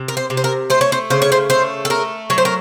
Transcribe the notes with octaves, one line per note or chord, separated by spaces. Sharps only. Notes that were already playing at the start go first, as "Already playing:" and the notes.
Already playing: C3
A#4
C5
C3
C5
A#4
A3 C5
C#5
C5
C#3 C5
C#5
C5
A3 C5
A4
A3 A#4
F#3 C#5
C5
A#4